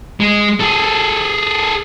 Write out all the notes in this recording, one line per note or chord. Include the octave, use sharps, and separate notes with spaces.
G#3
G#4 A4